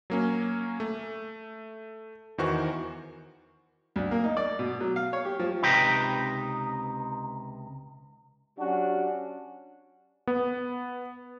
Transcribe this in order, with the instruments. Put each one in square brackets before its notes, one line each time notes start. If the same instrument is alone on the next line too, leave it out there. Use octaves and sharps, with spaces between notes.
[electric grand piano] F#3 A#3 C#4
A3
E2 D#3 E3 F#4 C5 C#6
[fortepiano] D2
A#3
D#4
D5
B2
F#3
F5
C#5
G4
F3
[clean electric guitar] C#2 C3 D#4 B4 G5
[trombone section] F#3 C#4 D4 F#4 G4
[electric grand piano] B3